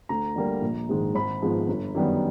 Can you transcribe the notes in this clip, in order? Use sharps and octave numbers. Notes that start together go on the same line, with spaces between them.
D2 A#5
D3 G3 A#3
A#1
G#2 D#3 G#3
G#1 B5
G#2 F3 G#3 B3
G1
F#2 D#3 G3 B3